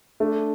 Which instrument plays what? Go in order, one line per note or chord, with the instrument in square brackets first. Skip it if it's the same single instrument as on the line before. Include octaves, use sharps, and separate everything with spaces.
[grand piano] A3 [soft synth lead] D4